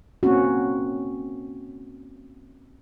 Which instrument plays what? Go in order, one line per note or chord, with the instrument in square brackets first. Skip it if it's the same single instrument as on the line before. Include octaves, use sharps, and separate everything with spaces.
[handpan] A#3 C4 C#4 F#4